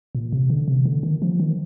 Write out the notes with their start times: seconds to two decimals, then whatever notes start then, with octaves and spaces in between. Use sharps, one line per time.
0.15 A#2
0.32 C3
0.50 D3
0.68 C3
0.86 D3
1.03 D#3
1.22 F3
1.40 D#3